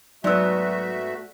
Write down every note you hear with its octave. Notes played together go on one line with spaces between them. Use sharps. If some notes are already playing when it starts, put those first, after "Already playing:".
G#2 F#3 A3 B3 F#4 D5 E5 E6